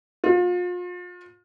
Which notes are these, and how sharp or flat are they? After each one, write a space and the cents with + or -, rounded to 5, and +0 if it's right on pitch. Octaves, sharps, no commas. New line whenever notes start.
F4 +35